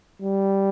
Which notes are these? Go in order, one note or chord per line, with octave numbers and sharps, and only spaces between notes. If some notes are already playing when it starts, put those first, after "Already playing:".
G3